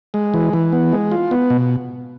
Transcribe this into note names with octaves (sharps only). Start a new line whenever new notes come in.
G#3
E3
E3
B3
G#3
F4
B3
B2